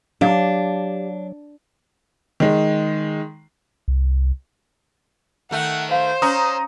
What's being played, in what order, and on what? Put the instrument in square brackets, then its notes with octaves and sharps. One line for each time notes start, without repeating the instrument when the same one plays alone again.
[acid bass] F#3 [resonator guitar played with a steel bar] D4 [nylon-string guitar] G4 F5
[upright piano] D#3 G#3
[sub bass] C2
[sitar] D#3 A3 [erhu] F#5
[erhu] C5 [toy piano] F5
[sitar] C#4 [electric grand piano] A#5 D#6